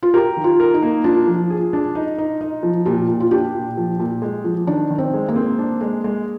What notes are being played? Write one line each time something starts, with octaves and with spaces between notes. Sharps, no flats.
F4
G4 A#4
D#3
F4
A#4
D#4
A#3
D4 F4
F3
G#4
D4
D#4
D#4
D#4
F3
A#2 G4
A#2
F4
D4 G4
A#2
F3
A#2
G#3
F3
D#3 D4
D#3
C4
G#3
A#3
C4
D4
G#3
G#3